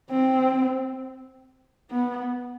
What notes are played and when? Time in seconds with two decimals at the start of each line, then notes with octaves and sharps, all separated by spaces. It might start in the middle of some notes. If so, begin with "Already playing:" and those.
0.11 C4
1.91 B3